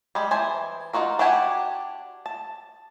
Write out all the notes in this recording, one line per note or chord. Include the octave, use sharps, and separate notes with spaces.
G3 G#3
E3 C5 G#5 A5
D#4 F4 F#4 A#4
D4 F#4 G4 F#5 G#5
A5